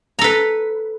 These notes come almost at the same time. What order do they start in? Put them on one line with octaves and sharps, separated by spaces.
A#5 A4 B4